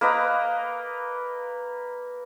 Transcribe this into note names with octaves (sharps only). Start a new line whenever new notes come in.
A#3 B4 D#5 A#5